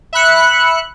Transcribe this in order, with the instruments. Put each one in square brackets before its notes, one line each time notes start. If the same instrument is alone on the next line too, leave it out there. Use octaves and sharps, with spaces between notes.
[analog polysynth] E5 B5 F#6 C#7